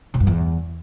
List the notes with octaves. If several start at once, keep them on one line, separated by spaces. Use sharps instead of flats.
C#3
G2
E2